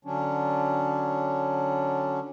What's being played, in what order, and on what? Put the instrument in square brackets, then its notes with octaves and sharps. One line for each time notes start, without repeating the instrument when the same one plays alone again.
[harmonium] D3 F#3 C#4 D4